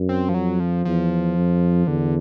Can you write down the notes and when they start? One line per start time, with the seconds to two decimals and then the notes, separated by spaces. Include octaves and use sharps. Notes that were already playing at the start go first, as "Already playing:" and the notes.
Already playing: F#2
0.09 C4
0.29 F3
0.34 F2 F#3
0.60 F3
0.85 E2 F3
1.37 F2
1.87 E2 D3